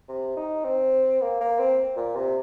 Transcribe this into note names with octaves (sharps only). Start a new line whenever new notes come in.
C3
D#4
C4
A#3
A#3
C4
A#2
C3